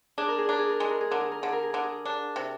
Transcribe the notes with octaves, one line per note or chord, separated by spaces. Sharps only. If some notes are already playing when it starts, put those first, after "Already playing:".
D4 G#4
A#4
G#4
D4 A#4
G#4
A#4
G#3 G#4
A#4
G#4
D3 A#4
G#4
A#4
D3 G#4
A#4
G#4
D3 A#4
G#4
D4
C3